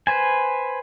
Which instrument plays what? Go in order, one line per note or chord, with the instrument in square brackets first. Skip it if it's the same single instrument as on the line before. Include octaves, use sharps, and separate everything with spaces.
[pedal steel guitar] B4 C5 G#5